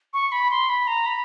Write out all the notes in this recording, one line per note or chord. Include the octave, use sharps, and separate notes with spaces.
C#6
B5
C6
B5
A#5
B5